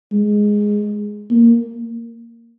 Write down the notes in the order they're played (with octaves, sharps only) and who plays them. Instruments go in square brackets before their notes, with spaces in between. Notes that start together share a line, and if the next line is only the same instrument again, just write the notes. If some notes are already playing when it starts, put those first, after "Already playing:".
[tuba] G#3
A#3